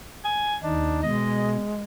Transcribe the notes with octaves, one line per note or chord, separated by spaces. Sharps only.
G#5
D#2 D4 D#4
B2 G#3 D#5